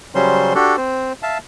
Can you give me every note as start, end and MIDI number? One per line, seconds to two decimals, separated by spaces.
0.15 0.53 49
0.15 0.53 54
0.15 0.53 55
0.15 0.53 61
0.15 0.53 72
0.15 0.53 84
0.55 0.76 62
0.55 0.76 66
0.55 0.76 67
0.55 0.76 69
0.77 1.13 60
0.77 1.13 72
1.23 1.38 76
1.23 1.38 77
1.23 1.38 81